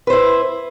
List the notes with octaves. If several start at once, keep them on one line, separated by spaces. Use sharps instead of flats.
E4 B4 C5